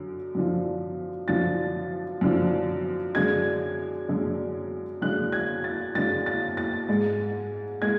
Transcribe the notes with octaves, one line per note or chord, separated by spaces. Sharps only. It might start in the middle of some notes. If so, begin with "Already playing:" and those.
Already playing: F#2 D3
F#2 D3 F3
F#2 D3 F3 A6
F#2 D3 F3
F#2 D3 G#3 G#6
F#2 D3 G#3
F#2 D3 G#3 F#6
G#6
A6
F#2 D3 G#3 A6
A6
A6
G#2 G#3
G#3 G#6